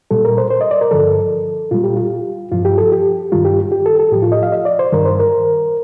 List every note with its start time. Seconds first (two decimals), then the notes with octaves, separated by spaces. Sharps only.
0.11 A#2 G3 A4
0.25 A#4
0.38 C5
0.50 C5
0.61 D#5
0.71 D5
0.81 A#4
0.91 G2 D3 F3 A4
1.71 A#2 G3 F4
1.84 G4
1.96 F4
2.52 G2 F3 F4
2.65 G4
2.78 A4
2.92 G4
3.32 G2 D#3 G3 F4
3.45 G4
3.72 G4
3.86 A4
3.99 A4
4.12 A2 F3 G4
4.22 F4
4.32 D#5
4.43 F5
4.52 D#5
4.65 D5
4.79 C5
4.92 G2 D#3 G3 A#4
5.05 C5
5.19 A#4